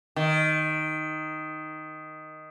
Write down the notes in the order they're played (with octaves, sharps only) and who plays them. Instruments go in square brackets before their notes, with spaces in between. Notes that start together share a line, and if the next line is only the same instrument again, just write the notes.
[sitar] D#3